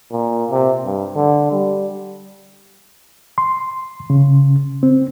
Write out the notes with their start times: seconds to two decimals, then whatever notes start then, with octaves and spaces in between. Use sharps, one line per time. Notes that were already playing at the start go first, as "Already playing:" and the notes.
0.11 A#2
0.51 C3
0.85 G2
1.16 D3
1.52 G3
3.38 C6
4.10 C#3
4.83 C4